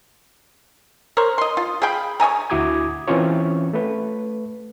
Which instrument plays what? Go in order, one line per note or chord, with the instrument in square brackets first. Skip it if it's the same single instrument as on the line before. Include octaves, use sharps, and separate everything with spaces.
[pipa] A#4 C5 C#5
D#5 C6
F4
G#4 F5 G5 B5
C#5 D#5 G#5 A#5
[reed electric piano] D2 E4 F#4 D6 D#6 G#6
E3 C4 C#4 F4 C#5
A3 B4